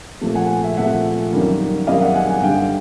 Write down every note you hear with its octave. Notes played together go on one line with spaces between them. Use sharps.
A#2 F3 A3
F#5 G#5
E5 F#5
A#2 F3 A3 E5 F#5
F#2 D#3 G3 A#3
F#2 D#3 G3 A#3 D#5 F5
E5 F#5
F#5 G#5
F#5 G#5
G2 D3 G3 F5 G5